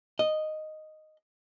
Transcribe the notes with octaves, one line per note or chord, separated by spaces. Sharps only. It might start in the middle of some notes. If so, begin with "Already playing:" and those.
D#5